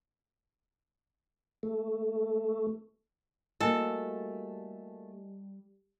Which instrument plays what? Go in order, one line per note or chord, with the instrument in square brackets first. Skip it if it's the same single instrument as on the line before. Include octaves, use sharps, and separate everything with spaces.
[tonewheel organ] A3
[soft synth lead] G3 [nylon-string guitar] A3 A#3 F#4 [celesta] E4 D#5 G#5 [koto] A4